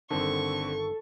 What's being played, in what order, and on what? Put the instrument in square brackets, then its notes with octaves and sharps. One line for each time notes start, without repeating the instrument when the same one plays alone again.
[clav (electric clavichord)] G1 D#3 [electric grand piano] D3 C4 [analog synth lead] A4 [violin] C#6